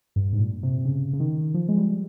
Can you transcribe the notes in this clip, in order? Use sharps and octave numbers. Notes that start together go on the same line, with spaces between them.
G2
G#2
A#2
C3
C#3
C#3
D#3
F3
G#3
G3